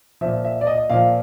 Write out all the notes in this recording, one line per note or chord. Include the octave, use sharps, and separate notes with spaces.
A#2 F3 E5
E5
D5
D#5
A#2 F3 F5